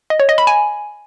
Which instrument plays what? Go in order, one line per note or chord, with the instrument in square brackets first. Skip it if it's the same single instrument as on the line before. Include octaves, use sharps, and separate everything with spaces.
[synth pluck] D#5
C#5
D#5
B5
G#5